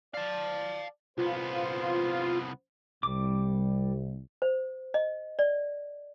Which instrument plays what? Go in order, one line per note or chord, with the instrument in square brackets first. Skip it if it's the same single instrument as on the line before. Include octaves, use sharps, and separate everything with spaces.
[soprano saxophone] D5 [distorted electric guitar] F5 A5
[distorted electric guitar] C2 B3 [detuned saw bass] F4 [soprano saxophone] C5
[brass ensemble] C2 [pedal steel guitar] G3 D6
[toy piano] C5
D#5
D5